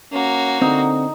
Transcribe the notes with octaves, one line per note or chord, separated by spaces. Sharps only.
A#3 C#4 F#4
D3 C4 D#4